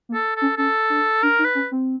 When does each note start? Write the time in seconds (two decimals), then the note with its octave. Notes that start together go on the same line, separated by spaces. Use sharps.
0.09 A#3
0.14 A4
0.36 A4
0.41 C#4
0.57 C#4 A4
0.90 D4
1.23 D4 A#4
1.39 D#4
1.45 B4
1.55 C#4
1.71 C4